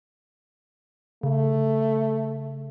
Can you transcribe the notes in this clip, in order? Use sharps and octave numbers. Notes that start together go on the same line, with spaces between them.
C#3 A3